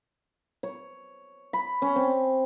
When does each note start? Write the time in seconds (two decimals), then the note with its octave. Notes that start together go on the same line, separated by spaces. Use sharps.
0.63 C#5
1.53 B5
1.82 C#4
1.96 C4